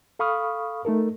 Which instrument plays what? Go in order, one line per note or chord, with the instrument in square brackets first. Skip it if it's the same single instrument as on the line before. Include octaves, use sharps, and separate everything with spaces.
[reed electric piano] A4 F5 B5 C#6 D#6 F6
A3 D#4 A4 A#4